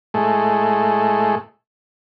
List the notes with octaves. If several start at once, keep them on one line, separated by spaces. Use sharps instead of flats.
A2 G#3 A3